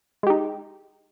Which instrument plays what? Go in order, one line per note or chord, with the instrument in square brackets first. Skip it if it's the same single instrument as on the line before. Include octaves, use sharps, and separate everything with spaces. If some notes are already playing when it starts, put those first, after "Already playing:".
[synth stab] G#3
G4
D#4